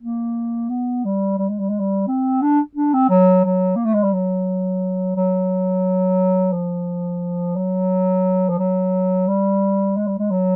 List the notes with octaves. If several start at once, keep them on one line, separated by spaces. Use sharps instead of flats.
A#3
B3
G3
G3
G#3
G3
G#3
G3
C4
D4
D4
C4
F#3
F#3
A#3
A3
G#3
G3
F#3
F#3
F3
F#3
F3
F#3
G3
G#3
G3
G#3
F#3